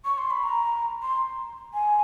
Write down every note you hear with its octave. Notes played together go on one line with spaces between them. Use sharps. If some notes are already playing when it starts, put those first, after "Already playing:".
C#6
C6
B5
A#5
C6
G#5